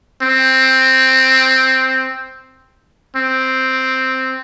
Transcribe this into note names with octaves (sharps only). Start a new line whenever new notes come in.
C4
C4